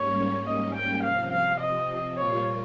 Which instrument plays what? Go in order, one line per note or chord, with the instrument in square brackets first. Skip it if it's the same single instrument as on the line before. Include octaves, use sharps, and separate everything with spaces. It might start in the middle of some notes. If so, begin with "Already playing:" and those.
Already playing: [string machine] G#2 G3 A#3 C#4 [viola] C#5
[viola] D#5
G5
[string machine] C3 F3 C4 [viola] F5
[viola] F5
D#5
[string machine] A#2 G3 A#3 F4 [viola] C#5